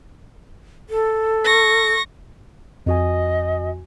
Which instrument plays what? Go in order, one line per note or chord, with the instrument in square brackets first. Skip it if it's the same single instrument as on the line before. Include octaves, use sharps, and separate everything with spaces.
[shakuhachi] A4
[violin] C#6 A#6
[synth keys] F2 F#4 G#5 [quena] D#5